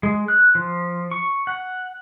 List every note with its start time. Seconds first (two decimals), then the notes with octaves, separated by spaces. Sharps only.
0.03 G#3
0.28 F#6
0.55 F3
1.11 C#6
1.47 F#5